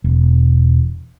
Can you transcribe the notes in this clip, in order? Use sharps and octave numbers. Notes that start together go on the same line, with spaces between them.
E1